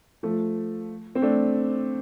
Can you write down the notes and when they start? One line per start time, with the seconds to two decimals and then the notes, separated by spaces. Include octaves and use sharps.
0.23 F3 A3
1.15 C4
1.22 A3 D4